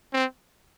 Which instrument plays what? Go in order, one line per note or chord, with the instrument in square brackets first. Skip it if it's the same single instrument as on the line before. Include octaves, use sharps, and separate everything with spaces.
[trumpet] C4